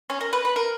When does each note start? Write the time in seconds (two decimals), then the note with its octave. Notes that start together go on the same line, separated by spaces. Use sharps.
0.10 C#4
0.21 A#4
0.33 B4
0.45 B4
0.56 A#4